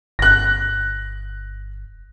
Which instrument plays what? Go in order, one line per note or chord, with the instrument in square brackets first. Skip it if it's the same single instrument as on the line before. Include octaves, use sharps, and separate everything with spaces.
[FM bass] G1 [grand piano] F#6 A#6